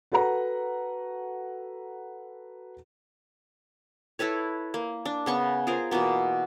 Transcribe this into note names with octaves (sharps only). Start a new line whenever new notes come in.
F#4 A4 B4 F#5 A#5
E4 A4 B4 C#5
A#3
D4
C#3 B3 C#6
F4 G#4 A#4 C5
B2 E3 A#3 B3